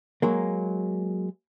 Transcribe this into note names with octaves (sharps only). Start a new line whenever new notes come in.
F#3 G#3 A#3